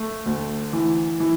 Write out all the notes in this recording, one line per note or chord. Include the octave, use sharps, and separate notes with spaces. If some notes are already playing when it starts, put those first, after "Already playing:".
Already playing: A3
D2
E3
E3